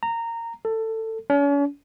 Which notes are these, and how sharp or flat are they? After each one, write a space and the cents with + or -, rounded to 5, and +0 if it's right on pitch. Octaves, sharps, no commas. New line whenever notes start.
A#5 -15
A4 +20
C#4 +40